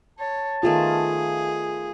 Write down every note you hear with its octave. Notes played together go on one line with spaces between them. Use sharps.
C#5 A5
D#3 A3 B3 F4 G#4